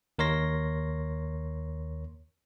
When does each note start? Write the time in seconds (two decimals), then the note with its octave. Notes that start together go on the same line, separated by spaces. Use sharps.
0.19 D#2 A#4 C#5 C6 A#6